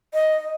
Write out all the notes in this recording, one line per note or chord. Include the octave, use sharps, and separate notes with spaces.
D#5